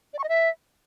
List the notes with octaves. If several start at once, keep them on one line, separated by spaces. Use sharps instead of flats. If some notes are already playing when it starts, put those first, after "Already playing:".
D5
C#6
D#5
E5